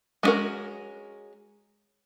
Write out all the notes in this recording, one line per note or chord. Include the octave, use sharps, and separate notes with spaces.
G#3 B3 C#4 F#4 A#4